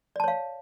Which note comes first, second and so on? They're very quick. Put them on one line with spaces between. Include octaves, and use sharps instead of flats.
D5 A5 C#5 F5